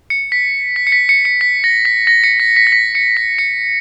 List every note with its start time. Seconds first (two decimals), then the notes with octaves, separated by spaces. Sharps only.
0.10 C#7
0.32 B6
0.76 B6
0.87 C#7
0.92 B6
1.09 C#7
1.25 C#7
1.41 B6
1.64 A#6
1.85 B6
2.07 A#6
2.24 C#7
2.40 B6
2.56 B6
2.67 A#6
2.72 B6
2.95 C#7
3.17 B6
3.39 C#7